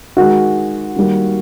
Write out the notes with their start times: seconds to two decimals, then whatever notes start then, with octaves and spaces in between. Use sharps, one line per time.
0.17 D#3 G#3 F#4
0.96 D#3 G3 A#3